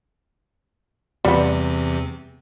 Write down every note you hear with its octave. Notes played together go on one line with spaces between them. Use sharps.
E2 C3 G3 B3